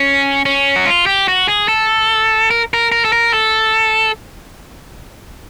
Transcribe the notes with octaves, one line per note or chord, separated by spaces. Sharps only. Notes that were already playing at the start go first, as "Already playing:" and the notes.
Already playing: C#4
C#4
F#4
F4
G4
F#4
G#4
A4
A#4
A#4
A#4
A4
A#4
A4